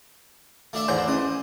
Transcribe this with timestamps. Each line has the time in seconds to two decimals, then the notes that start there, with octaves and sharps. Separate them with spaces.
0.73 A3 D4 E5
0.88 E2 G#2 C5 D5 G#5 A#5
1.08 C#4 D#5